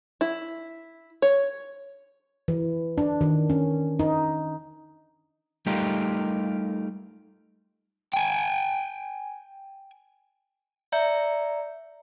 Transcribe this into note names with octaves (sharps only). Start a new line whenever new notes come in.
E4
C#5
E3
D4
D#3
C#4
D#4
G3 A3 D#4 F4 G4 A#4
G5 G#5
D5 E5 A#5 G6 C#7